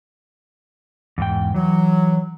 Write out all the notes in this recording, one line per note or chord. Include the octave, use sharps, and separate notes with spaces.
E2 G#2 G5
E3 F#3